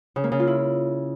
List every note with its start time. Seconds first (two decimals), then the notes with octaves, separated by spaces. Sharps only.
0.16 C#3
0.24 A#3
0.32 C#3
0.40 F4
0.47 E4